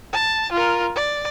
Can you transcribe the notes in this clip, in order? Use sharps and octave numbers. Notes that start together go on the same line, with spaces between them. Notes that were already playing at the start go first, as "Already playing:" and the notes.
A5
F4 A#4
D5